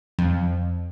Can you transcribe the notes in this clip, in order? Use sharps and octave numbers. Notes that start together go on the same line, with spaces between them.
F2